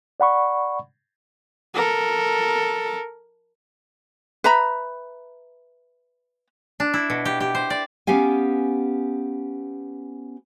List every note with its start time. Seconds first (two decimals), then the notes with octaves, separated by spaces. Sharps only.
0.20 D5 F#5 B5 C#6
1.75 A4 A#4
4.44 B4 E5 A#5 B5
6.80 D4
6.94 E4
7.10 B2
7.25 G4
7.40 G4
7.55 C5
7.70 D5
8.07 B3 C#4 G4 F5 G#5